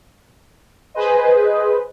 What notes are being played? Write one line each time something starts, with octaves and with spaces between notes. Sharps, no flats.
G#4 B4 C5 D#5